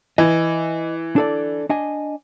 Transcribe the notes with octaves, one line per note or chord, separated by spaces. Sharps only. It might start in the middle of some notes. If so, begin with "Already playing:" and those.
E3 D#5
D4 A4 D5
D4 D#5 G#5